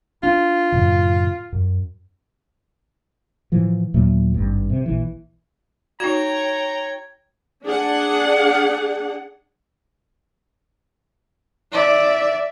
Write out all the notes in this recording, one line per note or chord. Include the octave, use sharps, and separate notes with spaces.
D4 F4
F#2 A2 C#3
F#2
A2 E3 F3
D#2 A#2 F#3 A3
G#1 G2
C3
A#1 E3
D#4 F#4 C#5 G5 A#5 G#6
D4 G#4 F#5
D5 E5